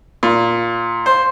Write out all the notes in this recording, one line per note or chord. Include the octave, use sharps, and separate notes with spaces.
A#2
C5